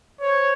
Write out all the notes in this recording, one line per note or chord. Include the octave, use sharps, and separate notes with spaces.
C5 C#5